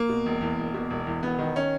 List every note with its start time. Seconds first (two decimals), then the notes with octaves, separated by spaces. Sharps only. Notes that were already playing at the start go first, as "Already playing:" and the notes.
Already playing: A#3
0.09 B2
0.26 E1
0.41 E2
0.58 E1
0.74 B2
0.90 E1
1.07 E2
1.22 E1 B3
1.39 D#3
1.56 C#4